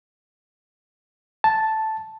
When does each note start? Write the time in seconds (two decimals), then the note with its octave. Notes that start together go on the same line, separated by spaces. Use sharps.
1.44 A5